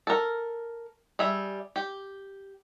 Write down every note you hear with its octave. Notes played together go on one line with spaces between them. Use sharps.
A4 A#4
G3 G#4 E5
G4